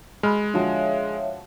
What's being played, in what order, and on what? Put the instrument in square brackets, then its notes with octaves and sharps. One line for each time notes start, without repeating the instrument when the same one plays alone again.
[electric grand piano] G#3 [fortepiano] B5 F6
[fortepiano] D3 F3 F#4 [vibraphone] C#5 E5 F5